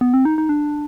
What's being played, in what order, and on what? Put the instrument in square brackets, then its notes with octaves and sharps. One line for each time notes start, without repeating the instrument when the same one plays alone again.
[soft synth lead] B3
C4
D#4
D#4
D4